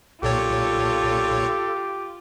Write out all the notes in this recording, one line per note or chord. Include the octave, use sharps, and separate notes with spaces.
B1 A#2 F4 G4 A4 C#5